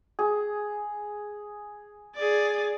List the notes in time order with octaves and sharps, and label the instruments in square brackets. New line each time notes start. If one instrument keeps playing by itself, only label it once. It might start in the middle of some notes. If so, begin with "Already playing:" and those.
[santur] G#4
[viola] G#4 D5